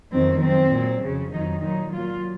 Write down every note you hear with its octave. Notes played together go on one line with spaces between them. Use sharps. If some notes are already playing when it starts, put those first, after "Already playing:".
F2 D#3 F#3 C4
F#2 F3 C4
A#2 F#3
F2 C#3 F#3
F2 D#3 F#3 D#4
A#2 F#3 D#4
A#2 F#3 F4